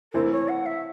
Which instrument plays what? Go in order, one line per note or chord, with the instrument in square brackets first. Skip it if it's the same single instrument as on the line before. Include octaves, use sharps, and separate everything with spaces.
[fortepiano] E3 A3 C4 E4 [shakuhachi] A#4
[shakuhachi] C#5
F#5
E5